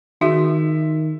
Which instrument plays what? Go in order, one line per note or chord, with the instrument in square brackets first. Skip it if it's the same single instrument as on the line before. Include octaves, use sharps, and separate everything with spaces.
[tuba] D#3 [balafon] D#4 F#4 G#4 [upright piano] E5